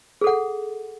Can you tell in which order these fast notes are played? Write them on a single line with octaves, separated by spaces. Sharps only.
G#4 A4 F#5